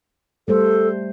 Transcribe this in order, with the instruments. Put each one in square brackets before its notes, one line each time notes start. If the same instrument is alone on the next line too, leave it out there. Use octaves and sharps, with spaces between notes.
[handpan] G3 A3 C5 [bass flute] A4